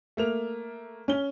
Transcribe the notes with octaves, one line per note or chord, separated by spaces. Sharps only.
A3 A#3 F7
C#4 G7